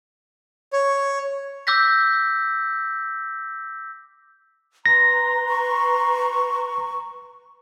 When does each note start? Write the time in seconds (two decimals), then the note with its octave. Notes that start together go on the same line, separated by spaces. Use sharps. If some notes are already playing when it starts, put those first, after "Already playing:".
0.73 C#5
1.67 D6 E6 G6 A#6 B6
4.86 B4 A#5 C6 A#6
5.49 C#6